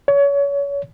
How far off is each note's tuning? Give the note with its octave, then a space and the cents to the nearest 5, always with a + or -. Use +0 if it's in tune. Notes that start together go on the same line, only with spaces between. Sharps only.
C#5 +30